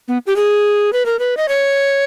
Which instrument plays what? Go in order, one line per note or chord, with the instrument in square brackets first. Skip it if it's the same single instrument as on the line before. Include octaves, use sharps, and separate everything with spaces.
[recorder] B3
G4
G#4
B4
A#4
B4
D#5
C#5